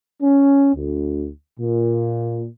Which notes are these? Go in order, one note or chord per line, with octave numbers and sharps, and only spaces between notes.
C#4
D2
A#2